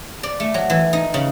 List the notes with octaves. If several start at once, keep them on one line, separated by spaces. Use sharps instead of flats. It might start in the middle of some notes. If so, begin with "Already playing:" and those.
D5
A3
F#3
E3
D#4
C#3